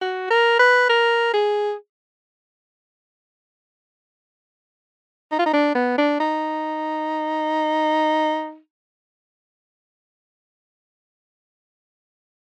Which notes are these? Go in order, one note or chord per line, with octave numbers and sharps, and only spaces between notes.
F#4
A#4
B4
A#4
G#4
D#4
F4
D#4
D4
B3
D4
D#4